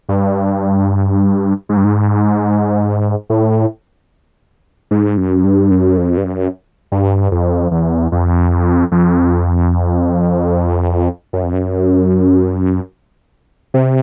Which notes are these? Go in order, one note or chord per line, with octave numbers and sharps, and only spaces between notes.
G2
G#2
G2
G#2
A2
G#2
F#2
G2
F#2
F2
G2
F#2
G2
F2
E2
F2
F2
F#2
F2
F#2
C3